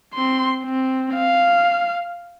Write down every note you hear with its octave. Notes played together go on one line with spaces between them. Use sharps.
C4 C6
C4
F5